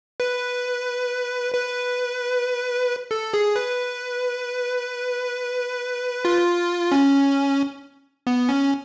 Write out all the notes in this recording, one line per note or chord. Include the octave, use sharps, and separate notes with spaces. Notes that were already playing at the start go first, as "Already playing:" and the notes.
B4
B4
A4
G#4
B4
F4
C#4
B3
C#4